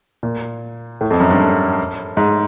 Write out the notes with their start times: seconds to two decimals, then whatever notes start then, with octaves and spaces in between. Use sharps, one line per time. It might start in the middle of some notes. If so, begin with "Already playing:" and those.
0.23 A#2
1.01 A2
1.10 F2
1.20 F#2
1.30 G2
2.17 G#2